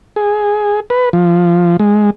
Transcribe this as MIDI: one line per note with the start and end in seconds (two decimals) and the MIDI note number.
0.16 0.80 68
0.90 1.09 71
1.13 1.77 53
1.79 2.10 56